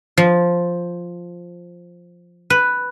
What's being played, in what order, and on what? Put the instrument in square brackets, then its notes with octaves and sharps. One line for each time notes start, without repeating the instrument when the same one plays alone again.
[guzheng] F3
B4